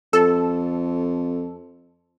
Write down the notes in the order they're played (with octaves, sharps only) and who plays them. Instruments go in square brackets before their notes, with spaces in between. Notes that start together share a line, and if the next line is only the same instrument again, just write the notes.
[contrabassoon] F2 [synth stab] A4